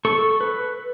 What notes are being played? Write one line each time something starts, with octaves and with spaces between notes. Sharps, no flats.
A4 C#6
B4